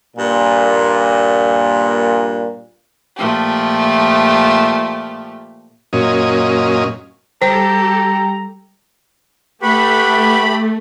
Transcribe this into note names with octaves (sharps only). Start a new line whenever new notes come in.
G2 A#2
A#2 F3 A3 G4
F#2 A#2 C#4 D#5
G3 G4 A4 C5 A#5
A3 G4 B4 F#5 B5 C#6